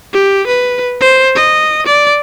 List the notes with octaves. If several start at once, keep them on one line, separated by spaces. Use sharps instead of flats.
G4
B4
C5
D#5
D5